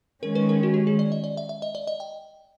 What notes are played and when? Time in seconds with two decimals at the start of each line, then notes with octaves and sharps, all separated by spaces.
0.23 D#3 G#3 C#4 A#4
0.35 B4
0.49 A#4
0.63 F#4
0.74 G4
0.87 G#4
0.99 D5
1.12 D#5
1.24 D5
1.37 E5
1.49 E5
1.62 D#5
1.75 D5
1.87 D#5
2.00 G5